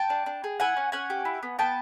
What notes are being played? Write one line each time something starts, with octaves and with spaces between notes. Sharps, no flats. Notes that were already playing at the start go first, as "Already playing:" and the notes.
Already playing: G5 A5
D4
D4
G#4
E4 F#5 G#5
C#4
C#4 F#5 G#5
G4
E4
B3
B3 G5 A5